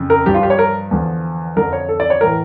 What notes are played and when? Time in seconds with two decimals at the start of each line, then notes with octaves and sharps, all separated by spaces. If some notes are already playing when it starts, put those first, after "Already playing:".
Already playing: F2 C#3
0.10 A#4
0.26 G2 F3 G4
0.34 F4
0.43 G4
0.50 C#5
0.59 A#4
0.91 E2 D3 F3
1.56 F2 D3 F3 A#4
1.73 C#5
1.89 A4
2.00 D5
2.10 C#5
2.21 A2 E3 A#4